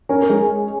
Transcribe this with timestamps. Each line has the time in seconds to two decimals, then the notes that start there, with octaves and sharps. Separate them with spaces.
0.09 C#4 A#4
0.22 A#4
0.29 G#3